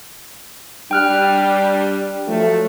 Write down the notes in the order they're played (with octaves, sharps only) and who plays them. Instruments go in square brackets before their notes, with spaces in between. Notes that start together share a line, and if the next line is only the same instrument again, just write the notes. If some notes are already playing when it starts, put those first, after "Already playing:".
[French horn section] G3 D4 [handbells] G5 F6 F#6
[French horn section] F3 F#3 A3